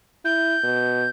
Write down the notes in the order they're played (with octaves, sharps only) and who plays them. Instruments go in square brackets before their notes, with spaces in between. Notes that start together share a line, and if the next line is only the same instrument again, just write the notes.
[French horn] E4 [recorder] G6
[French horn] B2